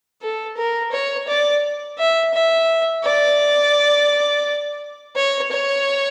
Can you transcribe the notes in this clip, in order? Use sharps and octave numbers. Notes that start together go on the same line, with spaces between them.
A4
A#4
C#5
D5
E5
E5
D5
C#5
C#5